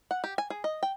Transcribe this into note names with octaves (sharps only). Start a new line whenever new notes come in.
F#5
G4
G#5
G#4
D#5
G5